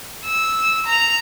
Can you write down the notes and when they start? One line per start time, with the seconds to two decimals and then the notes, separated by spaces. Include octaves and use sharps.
0.25 E6
0.86 A#5 F7